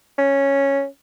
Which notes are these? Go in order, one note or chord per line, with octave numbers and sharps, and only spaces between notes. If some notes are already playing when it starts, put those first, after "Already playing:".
C#4